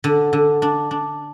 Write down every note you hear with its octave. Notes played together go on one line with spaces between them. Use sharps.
D3
D3
D4
D4